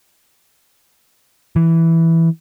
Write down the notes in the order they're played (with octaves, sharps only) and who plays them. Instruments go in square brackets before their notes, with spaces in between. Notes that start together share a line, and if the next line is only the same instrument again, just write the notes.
[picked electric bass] E3